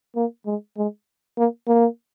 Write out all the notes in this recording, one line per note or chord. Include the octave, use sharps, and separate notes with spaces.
A#3
G#3
G#3
A#3
A#3